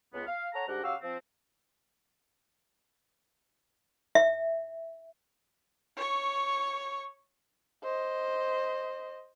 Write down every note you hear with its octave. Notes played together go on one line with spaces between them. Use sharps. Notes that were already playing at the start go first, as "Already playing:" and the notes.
C#2 B3
F5
A4 C#5 F#5 A#5
D2 G#2 D4 G4 A#4 F#5
C#3 F#4 G4 F5 E6
F3 C4
E5
C#5 C#6
C5 D#5